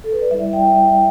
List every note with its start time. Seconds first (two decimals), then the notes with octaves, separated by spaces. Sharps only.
0.04 A4
0.13 B4
0.22 D5
0.31 G3 E4 E5
0.53 G5
0.76 E5